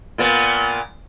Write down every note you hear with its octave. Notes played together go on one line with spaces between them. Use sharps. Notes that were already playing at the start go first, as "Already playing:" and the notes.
A#2 A#3 B3